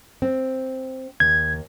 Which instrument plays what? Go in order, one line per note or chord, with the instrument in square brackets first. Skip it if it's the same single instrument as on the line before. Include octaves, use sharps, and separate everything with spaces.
[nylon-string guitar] C4
[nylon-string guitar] D#2 [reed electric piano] G#6